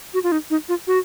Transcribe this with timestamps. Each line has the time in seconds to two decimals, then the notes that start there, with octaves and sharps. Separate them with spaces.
0.14 F#4
0.23 F4
0.32 D#4
0.50 D#4
0.69 F4
0.87 F#4